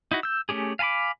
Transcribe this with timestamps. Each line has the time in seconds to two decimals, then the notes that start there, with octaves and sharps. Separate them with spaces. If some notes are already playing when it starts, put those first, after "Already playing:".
0.11 D#4 E4 F#4
0.23 E6 G6
0.49 A3 C#4 G4 G#4
0.79 F5 G#5 A5 B5 D6